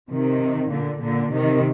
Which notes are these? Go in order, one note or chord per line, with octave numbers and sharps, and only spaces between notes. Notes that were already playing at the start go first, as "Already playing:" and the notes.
C3 D#3
A#2 D3
A#2 D3
C3 D#3